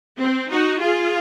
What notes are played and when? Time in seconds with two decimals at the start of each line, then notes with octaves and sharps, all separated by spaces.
0.19 C4
0.49 D#4 F#4
0.80 F4 G#4